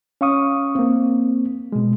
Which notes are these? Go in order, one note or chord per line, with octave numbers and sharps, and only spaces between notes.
C#4 F5 C#6 D#6
A#3 C4
B2 G#3